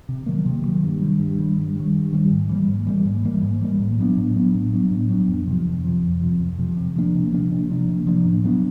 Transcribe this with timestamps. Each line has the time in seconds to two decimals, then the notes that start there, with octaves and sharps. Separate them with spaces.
0.09 C3
0.26 D#3 F#3 A#3
0.46 C3
0.64 D#3 F#3 A#3
0.83 G2
1.02 D#3 G3
1.20 G2
1.39 D#3 G3
1.57 G2
1.76 D#3 G3
1.94 G2
2.13 D#3 G3
2.31 G#2
2.49 E3 G3 A#3
2.68 G#2
2.87 E3 G3 A#3
3.05 G#2
3.25 E3 G3 A#3
3.43 G#2
3.61 E3 G3 A#3
3.79 A2
3.99 F#3 B3 D4
4.17 A2
4.36 F#3 B3 D4
4.55 A2
4.73 F#3 B3 D4
4.91 A2
5.10 F#3 B3 D4
5.28 F2
5.47 C3 F3
5.66 F2
5.84 C3 F3
6.03 F2
6.21 C3 F3
6.39 F2
6.59 C3 F3
6.77 C3
6.96 F3 A#3 D4
7.15 C3
7.33 F3 A#3 D4
7.51 C3
7.70 F3 A#3 D4
7.89 C3
8.07 F3 A#3 D4
8.25 A2
8.44 F#3 B3 D4